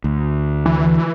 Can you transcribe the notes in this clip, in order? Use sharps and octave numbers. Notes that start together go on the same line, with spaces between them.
D2
E3